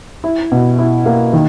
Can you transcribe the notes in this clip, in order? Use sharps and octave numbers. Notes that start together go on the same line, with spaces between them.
E4
B2
E4
A#3
D#3